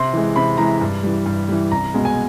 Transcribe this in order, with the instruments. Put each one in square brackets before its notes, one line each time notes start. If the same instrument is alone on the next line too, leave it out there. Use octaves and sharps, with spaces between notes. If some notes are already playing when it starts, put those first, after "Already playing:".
Already playing: [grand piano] C3 C6
E3 G#3
C3 B5
E3 G#3 A#5
G2
E3 G3
G2
E3 G3
C2 A#5
B2 G#3
G#5